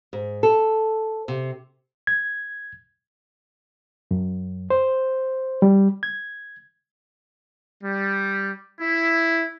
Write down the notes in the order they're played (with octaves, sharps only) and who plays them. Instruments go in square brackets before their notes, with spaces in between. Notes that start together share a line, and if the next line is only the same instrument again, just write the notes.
[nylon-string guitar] G#2
A4
C3
[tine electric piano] G#6
[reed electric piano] F#2
C5
G3
G#6
[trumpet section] G3
E4